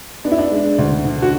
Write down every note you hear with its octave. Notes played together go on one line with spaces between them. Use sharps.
B3 D4
E4
D4
G#3
D2
D3
F#4